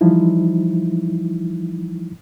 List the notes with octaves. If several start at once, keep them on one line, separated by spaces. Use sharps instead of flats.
E3 F3 G3 D#4 E4